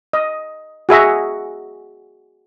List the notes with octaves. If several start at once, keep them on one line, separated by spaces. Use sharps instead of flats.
D#5
F#4 G#4 E5 A#5